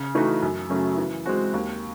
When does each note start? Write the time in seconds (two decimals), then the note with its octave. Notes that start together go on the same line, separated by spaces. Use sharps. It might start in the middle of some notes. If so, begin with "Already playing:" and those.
Already playing: C#3
0.15 E3 A3 D#4 F#4
0.42 F#2
0.70 C#3 F#3 A3 C#4
0.97 E3
1.26 G#3 C4 F#4
1.54 D#2